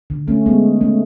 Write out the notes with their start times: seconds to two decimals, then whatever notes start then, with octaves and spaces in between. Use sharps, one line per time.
0.10 D3
0.28 A3 C#4
0.46 G#3 B3
0.81 A3 C#4